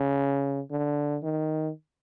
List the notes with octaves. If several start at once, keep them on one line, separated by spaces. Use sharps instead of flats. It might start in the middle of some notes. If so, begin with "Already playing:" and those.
Already playing: C#3
D3
D#3